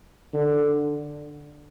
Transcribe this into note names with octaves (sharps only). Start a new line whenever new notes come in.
D3